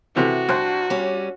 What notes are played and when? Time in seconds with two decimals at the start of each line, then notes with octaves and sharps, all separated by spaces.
0.16 C3 E3 A3 F#4
0.49 C2 D4 C5 F#5
0.90 G3 C#4